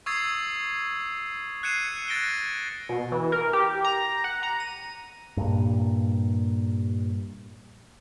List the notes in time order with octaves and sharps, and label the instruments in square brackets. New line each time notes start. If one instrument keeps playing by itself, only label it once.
[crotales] C#6 D#6 E6 G#6 A6 C7
F#6 G#6 C7 C#7 D#7 E7
F#6 A6 A#6 D7 G7
[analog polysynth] B2
E3
A#4
G4
A#5
F#5
A#5
D#7
[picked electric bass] G2 A#2